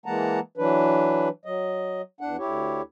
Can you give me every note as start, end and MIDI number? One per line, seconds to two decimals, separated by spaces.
0.06 0.40 52
0.06 0.40 56
0.06 0.40 58
0.06 0.40 78
0.06 0.40 81
0.06 0.40 82
0.57 1.29 52
0.57 1.29 54
0.57 1.29 62
0.57 1.29 71
1.45 2.02 54
1.45 2.02 75
2.21 2.37 40
2.21 2.37 62
2.21 2.37 78
2.39 2.82 38
2.39 2.82 64
2.39 2.82 67
2.39 2.82 73